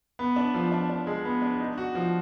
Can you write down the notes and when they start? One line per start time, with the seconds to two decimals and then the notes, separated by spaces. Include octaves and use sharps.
0.19 B3
0.36 D4
0.54 F3
0.72 D4
0.90 D4
1.07 G#3
1.25 B3
1.42 D4
1.60 D#4
1.78 F#4
1.95 F3